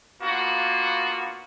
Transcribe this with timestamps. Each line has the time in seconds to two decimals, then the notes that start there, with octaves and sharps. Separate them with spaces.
0.22 A#3 B3 D4 F4 F#4